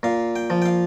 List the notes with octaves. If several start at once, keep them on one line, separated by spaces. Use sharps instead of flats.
A#2 F5
G5
F3
G5
F5